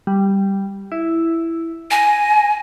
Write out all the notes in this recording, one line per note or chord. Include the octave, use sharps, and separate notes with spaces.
G3
E4
G#5 A#6